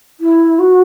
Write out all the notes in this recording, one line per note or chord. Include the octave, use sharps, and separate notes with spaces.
E4
F#4